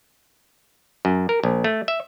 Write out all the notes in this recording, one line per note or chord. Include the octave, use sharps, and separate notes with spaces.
F#2
A#4
A#1
A3
E5